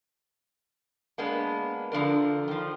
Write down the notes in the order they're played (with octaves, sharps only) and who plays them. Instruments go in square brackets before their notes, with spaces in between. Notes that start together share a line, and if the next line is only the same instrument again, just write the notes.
[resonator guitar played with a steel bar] G#3 A#3 B3 D4
D3 F3 D4 A#4
D#3 F3